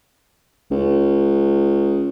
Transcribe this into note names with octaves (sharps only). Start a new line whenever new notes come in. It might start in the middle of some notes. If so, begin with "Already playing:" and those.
C#2